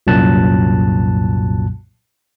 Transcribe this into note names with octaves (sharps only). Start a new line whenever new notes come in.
C2 F#2 A#2 F#3 A5 F#6